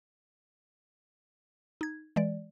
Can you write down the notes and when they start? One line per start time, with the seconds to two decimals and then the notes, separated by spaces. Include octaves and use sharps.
1.81 D#4 G#6
2.16 E3 G#3 D5